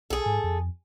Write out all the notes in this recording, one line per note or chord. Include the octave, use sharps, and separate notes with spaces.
B1 G#4 A4
G#2
F2